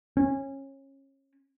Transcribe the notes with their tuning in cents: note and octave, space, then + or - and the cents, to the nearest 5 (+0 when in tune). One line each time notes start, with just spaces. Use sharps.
C#4 -25